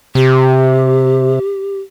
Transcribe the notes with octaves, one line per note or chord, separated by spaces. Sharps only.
C3 G4